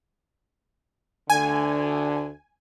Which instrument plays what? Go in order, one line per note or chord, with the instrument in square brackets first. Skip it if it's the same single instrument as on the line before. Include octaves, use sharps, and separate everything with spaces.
[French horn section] D2 D3 [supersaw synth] G#5